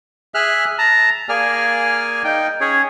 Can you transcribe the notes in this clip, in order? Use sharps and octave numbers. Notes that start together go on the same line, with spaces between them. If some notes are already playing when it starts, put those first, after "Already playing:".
G#4 E5 F6 F#6
A5 A#5
A#3 G#4 D5 G#5 F6
D#4 G5
C#4 G#4 C#5